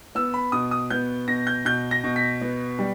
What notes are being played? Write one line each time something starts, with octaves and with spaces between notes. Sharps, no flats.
B3 E6
B5
B2 D#6
D#6
B3 G6
B2 A#6
G6
B2 G6
A#6
B2
B6
B3
G3